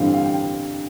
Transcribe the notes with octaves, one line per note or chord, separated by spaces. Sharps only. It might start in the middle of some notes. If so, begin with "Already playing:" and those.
Already playing: A1 G2 D3 G3 C4 F5
F5
G5